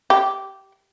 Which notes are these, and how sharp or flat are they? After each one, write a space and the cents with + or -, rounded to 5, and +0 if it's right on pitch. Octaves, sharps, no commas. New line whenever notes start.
G4 -15